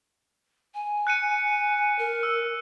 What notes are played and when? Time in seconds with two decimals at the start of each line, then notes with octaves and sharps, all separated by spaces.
0.74 G#5
1.07 F#6 C#7 D#7
1.99 A#4
2.23 E6